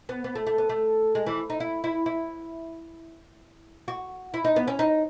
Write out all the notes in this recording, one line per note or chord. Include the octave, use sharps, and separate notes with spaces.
B3
B3
A3
A3
B3
A3
G#3
E3
D#4
E4
E4
E4
F#4
E4
D#4
B3
C#4
D#4